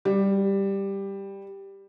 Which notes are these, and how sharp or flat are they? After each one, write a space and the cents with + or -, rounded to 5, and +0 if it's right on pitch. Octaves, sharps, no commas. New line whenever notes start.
G3 +5